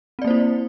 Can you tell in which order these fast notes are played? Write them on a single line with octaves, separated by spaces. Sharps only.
C4 D5 A#3 C5 E4